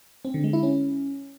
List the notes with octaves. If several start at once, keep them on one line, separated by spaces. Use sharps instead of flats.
C4
D3
G#3
E4
C#4